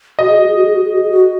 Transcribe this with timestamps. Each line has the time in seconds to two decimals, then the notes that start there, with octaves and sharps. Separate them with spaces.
0.19 F#4 D#5
0.28 G#4
0.38 F#4
0.46 G#4
0.55 F#4
0.64 G#4
0.73 F#4
0.83 G#4
0.93 F#4
1.01 G#4
1.10 F#4